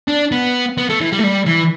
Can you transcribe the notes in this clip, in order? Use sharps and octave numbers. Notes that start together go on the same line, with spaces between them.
D4
B3
B3
A3
E3
G3
A3
G3
E3